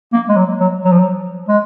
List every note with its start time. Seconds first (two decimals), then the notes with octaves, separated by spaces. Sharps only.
0.13 A#3
0.29 G#3
0.36 F#3
0.60 F#3
0.85 F#3
0.92 F3
0.99 F#3
1.48 G#3